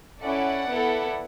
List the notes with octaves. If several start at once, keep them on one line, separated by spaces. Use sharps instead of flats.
C#4 E4 A4 D5 F#5
B3 E4 A4